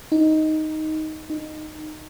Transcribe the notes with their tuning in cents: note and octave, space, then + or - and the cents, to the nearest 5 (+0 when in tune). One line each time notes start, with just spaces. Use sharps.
D#4 +5
D#4 -15